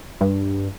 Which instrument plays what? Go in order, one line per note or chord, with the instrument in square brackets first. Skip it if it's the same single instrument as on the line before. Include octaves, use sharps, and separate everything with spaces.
[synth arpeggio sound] G2